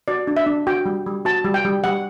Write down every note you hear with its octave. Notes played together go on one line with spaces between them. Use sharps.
F#4 D5
D4
E5
D4
F#4 G5
G3
G3
F#4 A5
G3
G5
G3
G3 F#5